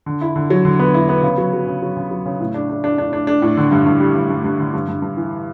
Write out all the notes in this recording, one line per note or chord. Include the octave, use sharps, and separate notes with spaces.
D3
E4
D3
F#3
D3
B3
E4
B3
C#3
F#3
F#3
C#3
F#3
C#3
F#3
C#3
A2
D4
D4
D4
D4
D4
D4
A2
D3
G2
G2
G3
G2
G2
G2
D3
G2
G2
G2
E3